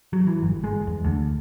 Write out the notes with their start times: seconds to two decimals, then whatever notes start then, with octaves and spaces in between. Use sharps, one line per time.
0.13 F#3
0.27 E3
0.42 G1
0.64 G#3
0.87 E2
1.04 D2